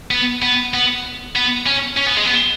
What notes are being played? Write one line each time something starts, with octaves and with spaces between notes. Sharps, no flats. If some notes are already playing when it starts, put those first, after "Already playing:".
B3
B3
B3
B3
C#4
C#4
B3
G#3
B3